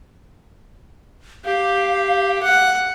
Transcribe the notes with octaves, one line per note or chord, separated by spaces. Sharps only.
G4 F5
F#5